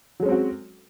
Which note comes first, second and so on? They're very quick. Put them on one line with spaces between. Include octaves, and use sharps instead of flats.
F#3 G#3 C#4 C4 F#4